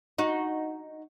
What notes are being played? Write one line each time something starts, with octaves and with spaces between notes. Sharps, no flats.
D#4 F#4